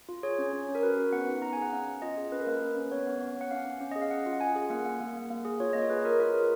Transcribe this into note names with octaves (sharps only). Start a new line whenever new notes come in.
F4
G#4 C#5
C#4
C#4
C#4
A#4
F#4 B4
F#4
B3 F#5
D#4
B3 A#5
G#4 G#5
F#5
C#4 F5
C#4
F4 D#5
G#4
C#4 B4
A#4
A#3 B4
A#3 B4
C#4
B3 C#5
B3
B3
B3 F#5
C#4 F5
C#4
C#4
G#4 D#5
F5
C#4 F#5
F4
F#5
F4 G#5
G#4
A#3 F#5
A#3
A#3
A#3
A#3
G#4
F4 C#5
A#3 D#5
C#5
G#4 B4
F4 A#4
F4 A#4
G#4